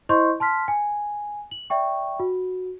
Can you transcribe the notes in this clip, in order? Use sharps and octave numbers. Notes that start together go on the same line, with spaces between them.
E4 C5 D#5 C6 C#6 G6
A5 C6 F6 B6
G#5
F#7
D5 E5 G5 C#6
F#4